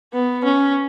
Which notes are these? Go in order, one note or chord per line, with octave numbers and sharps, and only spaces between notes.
B3
C#4